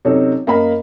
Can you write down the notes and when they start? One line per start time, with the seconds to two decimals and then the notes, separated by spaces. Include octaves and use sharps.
0.05 C3 F#3 C#4 D#4 A4
0.47 F#2 A#3 D#5 F5 A#5 B5